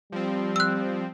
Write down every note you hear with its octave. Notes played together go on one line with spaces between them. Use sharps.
F3 G3 C4
E6 F#6